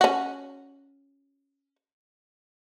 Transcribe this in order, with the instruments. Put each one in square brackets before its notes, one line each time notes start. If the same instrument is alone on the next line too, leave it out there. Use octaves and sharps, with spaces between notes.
[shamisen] C#4 F#4